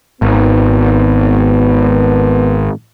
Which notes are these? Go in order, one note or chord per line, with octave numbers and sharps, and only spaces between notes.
G#1 B3